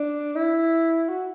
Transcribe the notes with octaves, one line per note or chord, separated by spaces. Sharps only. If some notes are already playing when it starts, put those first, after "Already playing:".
Already playing: D4
E4
F#4